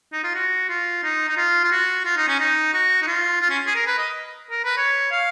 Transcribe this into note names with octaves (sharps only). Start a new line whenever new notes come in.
D#4
F4
F#4
F4
D#4
D#4
F4
F4
F#4
F4
D#4
C#4
D#4
F#4
D#4
F4
F4
C#4
G#4
A#4
B4
D#5
A#4
B4
C#5
F5